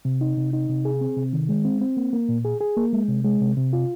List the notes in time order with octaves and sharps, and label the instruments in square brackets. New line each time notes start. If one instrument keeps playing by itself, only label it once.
[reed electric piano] C3
D#4
C3
D#4
C3
G#4
C4
C3
D#3
G#3
C4
C4
A#3
A#3
A#2
G#4
G#4
A#3
G#3
C3
G#3
C3
C3
F4